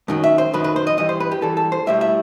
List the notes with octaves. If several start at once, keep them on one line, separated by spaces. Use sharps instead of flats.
F#2 D#3 F#3
E5
C5
F#2 D#3 F#3 B4
B4
C5
D#5
G2 E3 G3 D#5
C5
B4
G4
G2 E3 G3 A4
A4
C5
B1 A2 G3 E5
E5